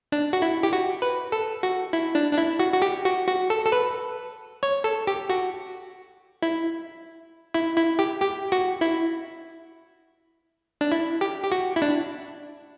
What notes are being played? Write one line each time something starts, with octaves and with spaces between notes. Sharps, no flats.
D4
F#4
E4
G4
F#4
B4
A4
F#4
E4
D4
D4
E4
F#4
F#4
G4
F#4
F#4
A4
A4
B4
C#5
A4
G4
F#4
E4
E4
E4
G4
G4
F#4
E4
D4
E4
G4
G4
F#4
E4
D4